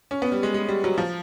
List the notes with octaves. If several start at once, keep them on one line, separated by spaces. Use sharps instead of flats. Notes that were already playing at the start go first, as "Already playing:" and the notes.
C#4
B3
G3
G#3
G#3
G3
F#3
F3